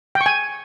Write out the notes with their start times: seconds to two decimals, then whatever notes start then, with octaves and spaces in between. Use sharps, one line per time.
0.15 G5
0.21 C#6
0.26 G#5